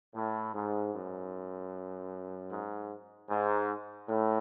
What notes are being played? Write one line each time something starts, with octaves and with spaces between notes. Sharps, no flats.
A2
G#2
F#2
G#2
G#2
A2